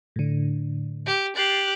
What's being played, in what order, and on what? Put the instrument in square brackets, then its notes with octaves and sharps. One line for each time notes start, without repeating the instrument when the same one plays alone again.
[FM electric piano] A2 D3
[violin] G4
[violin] G4 F#6 [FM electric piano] A6 C7